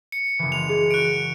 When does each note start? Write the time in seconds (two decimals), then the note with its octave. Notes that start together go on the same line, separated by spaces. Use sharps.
0.12 C#7
0.39 F#1 E3
0.52 G#3 F7
0.69 G#3 G#4
0.90 F#4 F#6 D7 D#7